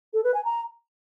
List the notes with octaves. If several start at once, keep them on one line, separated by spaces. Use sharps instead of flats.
A4
B4
G#5
A#5